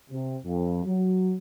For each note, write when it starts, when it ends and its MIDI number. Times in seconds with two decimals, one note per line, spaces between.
0.10 0.36 48
0.44 0.82 41
0.85 1.35 54